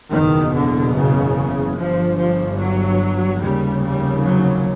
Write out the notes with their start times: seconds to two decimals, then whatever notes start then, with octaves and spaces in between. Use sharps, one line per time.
0.12 F#1 E2 B2 D#3
0.54 D3
0.95 C#3
1.77 G1 G2 F3
2.19 F3
2.59 F#3
3.41 F1 D#2 C#3 G3
3.83 G3
4.24 F#3